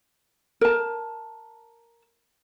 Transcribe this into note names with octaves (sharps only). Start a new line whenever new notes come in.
A#4 A5